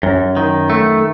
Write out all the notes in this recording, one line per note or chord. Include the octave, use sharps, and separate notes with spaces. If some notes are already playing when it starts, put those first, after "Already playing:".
F#2
D#3
A3